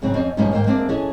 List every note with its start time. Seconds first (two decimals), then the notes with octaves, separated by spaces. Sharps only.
0.02 G#2 C#3 F#3 C4
0.14 F2 C4 C#4 D#5
0.37 G2 B2 F3 G#3 C#4 D#4
0.51 G#2 D#3 A#3 C5 G5
0.66 G#3 A#3 C4 D4 D5 E5
0.89 E3 C#4 G#4 A4 D#5